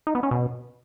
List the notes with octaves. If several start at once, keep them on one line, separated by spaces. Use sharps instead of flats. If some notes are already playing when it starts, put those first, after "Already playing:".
D#4
B3
C#4
B2